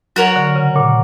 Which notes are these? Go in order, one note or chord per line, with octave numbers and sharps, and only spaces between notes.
F#3 F#4 A#4 C#5
D3
C#3
A#2